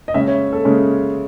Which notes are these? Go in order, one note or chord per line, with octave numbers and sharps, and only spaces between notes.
D#5
C#3 G#3 C#4 E5
C#5
A4
C#3 G#3 C#4